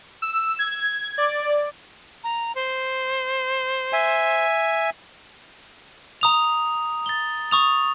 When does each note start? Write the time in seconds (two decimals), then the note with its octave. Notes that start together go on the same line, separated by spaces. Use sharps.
0.22 E6
0.59 G#6
1.18 D5
2.24 A#5
2.55 C5
3.93 E5 G#5
6.21 A#5 D#6 F7
7.06 A6 G7
7.51 C#6 D#6 F7